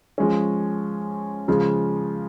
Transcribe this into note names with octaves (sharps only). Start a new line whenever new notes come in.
F3 G#3 C#4
C#3 F3 G#3